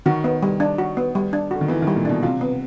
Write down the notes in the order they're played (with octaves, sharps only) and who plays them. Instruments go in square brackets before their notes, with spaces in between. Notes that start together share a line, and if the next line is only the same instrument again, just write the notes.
[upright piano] D#3 [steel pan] F#4
[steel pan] B3
G3
D4
F#4
B3
G3
D4
[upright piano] D3 [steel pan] F#4
[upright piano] D#3
[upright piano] E3 [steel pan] B3
[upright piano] D#3
[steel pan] G3
[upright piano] A#2
[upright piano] B2 [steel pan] D4
[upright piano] C3 [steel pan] F4
[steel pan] B3